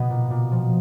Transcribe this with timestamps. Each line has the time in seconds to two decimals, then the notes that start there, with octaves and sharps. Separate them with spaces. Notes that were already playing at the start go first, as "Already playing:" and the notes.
Already playing: B2 B3
0.10 A#2
0.30 A#2
0.52 F3